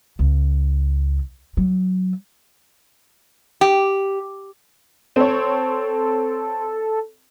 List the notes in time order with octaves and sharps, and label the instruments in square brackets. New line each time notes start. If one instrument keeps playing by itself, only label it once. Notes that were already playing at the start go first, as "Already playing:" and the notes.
[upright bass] C#2
F#3
[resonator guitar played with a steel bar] G4
[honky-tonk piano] C4 C#5 [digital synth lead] A4